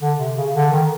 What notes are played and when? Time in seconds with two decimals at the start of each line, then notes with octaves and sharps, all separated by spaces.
0.01 D3
0.19 C3
0.36 C#3
0.54 D3
0.71 D#3